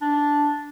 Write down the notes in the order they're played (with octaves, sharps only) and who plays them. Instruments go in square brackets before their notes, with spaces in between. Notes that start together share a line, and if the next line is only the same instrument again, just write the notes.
[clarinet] D4